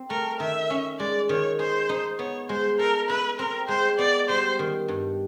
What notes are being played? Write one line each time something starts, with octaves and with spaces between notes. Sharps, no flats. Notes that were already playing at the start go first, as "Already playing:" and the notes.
Already playing: C4
A3 A#4
D#3 E5
C#4
G#3 D5
D#3 C#5
G#4 C5
D#4
B3 C#5
G#3 C5
A4 A#4
E4 B4
C4 A#4
G#3 C5
B3 D5
G3 C5
D#3
G2